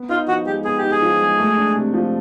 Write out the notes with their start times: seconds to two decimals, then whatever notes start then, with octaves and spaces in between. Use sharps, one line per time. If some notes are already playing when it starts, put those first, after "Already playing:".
Already playing: B3
0.09 D#4 F4
0.28 F3 F#4
0.46 G#3 G4
0.65 B3 G#4
0.78 G4
0.83 D#4
0.91 G#4
1.02 F3
1.21 G#3
1.39 A3
1.57 D4
1.76 C3
1.94 F3